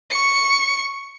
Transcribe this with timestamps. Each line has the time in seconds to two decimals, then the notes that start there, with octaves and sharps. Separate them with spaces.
0.11 C#6 C#7